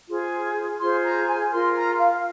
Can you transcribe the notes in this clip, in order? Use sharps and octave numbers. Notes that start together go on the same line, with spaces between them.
F4 G#4 C5
F4 G#4 C5 C6
A#5
G#5
F4 A#4 C6
A#5
F5